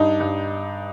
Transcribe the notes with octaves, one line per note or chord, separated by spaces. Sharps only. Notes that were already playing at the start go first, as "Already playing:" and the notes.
Already playing: G2 D#4
G2